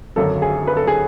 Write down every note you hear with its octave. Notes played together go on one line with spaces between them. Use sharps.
G#1 F#2 D3 F#3 A4
G#4
B4
A4
G#4